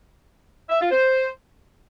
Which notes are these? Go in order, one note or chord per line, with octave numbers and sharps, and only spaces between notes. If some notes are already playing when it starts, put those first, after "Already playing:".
E5
F4
C5